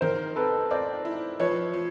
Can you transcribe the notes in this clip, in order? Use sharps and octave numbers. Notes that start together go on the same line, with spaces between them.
D#3 A#4 C5
C4 A4 B4
C4 C5 D5
E4
F3 B4 C#5
F3